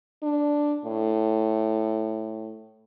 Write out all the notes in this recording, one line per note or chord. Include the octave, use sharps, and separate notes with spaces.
D4
A2